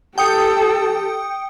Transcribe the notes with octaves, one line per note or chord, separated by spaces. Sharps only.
G4 A4 G5 D#6 C#7